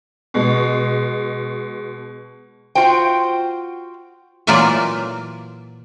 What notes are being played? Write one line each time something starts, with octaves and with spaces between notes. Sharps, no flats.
B2 G#3
F4 F#4 C5 G5
A#2 E3 F#3 A#3 F4 D5